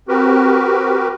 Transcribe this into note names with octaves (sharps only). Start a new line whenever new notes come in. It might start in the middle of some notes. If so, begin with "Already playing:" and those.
C4 F#4 G4 A#4 B4